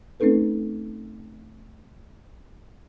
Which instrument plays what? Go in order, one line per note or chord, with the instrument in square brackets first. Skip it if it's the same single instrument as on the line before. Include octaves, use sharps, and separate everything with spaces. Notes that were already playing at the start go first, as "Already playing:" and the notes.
[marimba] A3 C4 C#4 D#4 A4 B4